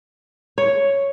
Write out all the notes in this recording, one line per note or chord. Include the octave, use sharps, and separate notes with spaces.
C#5